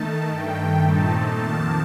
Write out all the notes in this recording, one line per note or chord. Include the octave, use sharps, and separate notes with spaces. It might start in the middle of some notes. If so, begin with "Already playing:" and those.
Already playing: D#3 A3 D#4 A5
G2 D#3 A3 G5
A#2 A3 C4 D#4 A5
F2 D#3 A#3 A5